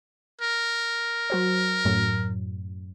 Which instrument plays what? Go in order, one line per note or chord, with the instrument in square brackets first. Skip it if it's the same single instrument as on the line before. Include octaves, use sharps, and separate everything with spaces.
[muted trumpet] A#4
[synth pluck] F#3 F#4 C5
F#2 A2 F#3